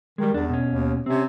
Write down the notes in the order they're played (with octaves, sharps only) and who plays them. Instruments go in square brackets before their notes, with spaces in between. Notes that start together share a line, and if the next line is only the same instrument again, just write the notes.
[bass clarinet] D#3 [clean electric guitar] G3 G#3
[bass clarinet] E2 [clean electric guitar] D4
[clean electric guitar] B2 C#4
[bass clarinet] D#2
[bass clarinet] C3 [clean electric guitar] C4 C#4